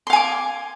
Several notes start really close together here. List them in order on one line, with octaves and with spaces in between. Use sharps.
C6 F5 G#5 D6